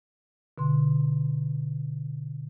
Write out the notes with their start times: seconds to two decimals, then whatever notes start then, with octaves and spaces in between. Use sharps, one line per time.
0.58 B2 D3 C6